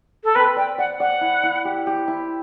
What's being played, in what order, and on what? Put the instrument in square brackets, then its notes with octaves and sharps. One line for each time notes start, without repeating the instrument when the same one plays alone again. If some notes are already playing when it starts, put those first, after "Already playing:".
[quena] A4
[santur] C4 [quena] B4
[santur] D5 [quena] G5
[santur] D5 [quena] F#5
[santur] D5 [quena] F#5
[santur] E4
E4
G4
G4
E4